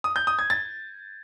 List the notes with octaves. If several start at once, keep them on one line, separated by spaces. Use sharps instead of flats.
D#6
G6
D#6
G#6
A6